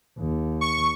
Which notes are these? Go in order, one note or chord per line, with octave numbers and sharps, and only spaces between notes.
D#2
C#6